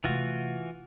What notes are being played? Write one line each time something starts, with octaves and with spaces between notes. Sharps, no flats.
C3 E3 A3 F4 F#4